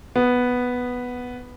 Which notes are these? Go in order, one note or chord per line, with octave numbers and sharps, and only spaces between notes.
B3